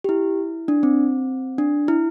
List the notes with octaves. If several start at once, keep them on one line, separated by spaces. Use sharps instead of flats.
G4
E4
D4
C4
D4
E4